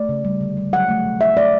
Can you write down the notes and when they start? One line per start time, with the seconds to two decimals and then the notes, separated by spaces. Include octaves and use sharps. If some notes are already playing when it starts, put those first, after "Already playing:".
Already playing: A3 D5
0.09 C#3
0.25 G3
0.41 D3
0.57 G3
0.73 F#3 F#5
0.89 A3
1.05 B2
1.21 F#3 E5
1.37 A3 D5